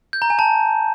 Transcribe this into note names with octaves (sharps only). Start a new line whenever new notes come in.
G6
A#5
G#5
A5